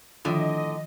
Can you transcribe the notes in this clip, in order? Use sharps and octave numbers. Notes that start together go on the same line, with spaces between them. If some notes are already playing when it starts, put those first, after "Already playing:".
A2 D3 D#3 F3 F4 D#5